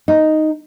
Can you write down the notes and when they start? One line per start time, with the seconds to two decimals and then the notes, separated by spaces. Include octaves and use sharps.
0.08 D#4